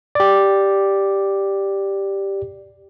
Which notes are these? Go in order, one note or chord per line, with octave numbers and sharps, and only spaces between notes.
G4 D5